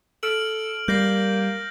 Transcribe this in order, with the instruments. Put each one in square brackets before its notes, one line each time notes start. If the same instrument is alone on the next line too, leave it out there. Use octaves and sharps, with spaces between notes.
[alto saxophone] A4 [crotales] F6 D7 F#7
[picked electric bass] G3 [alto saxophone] A#3 [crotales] G6 A#6 C7